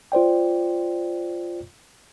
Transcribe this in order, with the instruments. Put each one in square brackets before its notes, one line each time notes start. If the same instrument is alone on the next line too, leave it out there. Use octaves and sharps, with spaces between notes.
[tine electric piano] F4 C5 D5 G5